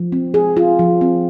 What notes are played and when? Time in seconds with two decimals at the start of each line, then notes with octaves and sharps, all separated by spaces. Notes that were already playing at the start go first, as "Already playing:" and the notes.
Already playing: F3
0.12 C4
0.34 G#4
0.57 F4
0.79 F3
1.01 C4